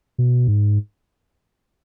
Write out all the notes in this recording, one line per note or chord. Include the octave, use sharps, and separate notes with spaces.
B2
G#2